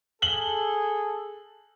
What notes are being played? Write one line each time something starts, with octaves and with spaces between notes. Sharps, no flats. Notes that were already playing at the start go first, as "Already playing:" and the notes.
G#4 A4 F#7 G7